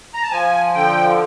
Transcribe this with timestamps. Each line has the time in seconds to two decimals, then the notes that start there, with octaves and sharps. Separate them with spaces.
0.14 A#5
0.23 A5
0.32 F3 G#5
0.75 D3 G5